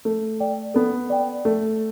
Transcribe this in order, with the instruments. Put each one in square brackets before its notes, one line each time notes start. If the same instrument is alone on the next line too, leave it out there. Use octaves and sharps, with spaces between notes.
[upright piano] A3 [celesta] A4
[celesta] D5 G5
[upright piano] B3 [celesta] A4
[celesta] D5 G5
[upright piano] A3 [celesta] A4